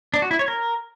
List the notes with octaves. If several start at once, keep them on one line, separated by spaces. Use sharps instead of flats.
D4
F#4
E4
C#5
A#4